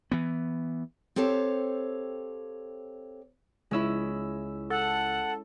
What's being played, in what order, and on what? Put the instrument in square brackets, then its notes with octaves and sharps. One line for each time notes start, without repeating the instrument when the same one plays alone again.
[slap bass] E3 B3
[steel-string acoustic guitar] C4 G4 A4 C#5 F5
[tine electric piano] C#2 E6 [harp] G#3 C#4 E4
[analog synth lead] A4 [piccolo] F#5